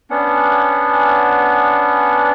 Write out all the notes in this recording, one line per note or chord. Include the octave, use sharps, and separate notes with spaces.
B3 C#4 D4 F#5